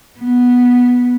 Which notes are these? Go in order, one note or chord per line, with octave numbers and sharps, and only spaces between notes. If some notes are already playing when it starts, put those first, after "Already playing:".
B3